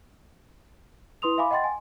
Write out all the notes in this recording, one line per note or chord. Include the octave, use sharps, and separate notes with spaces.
E4 B4 C6 D#6 F7
E5 F5 G#5 B5 D6
D#5 F#5 G5 C6 A6
G#5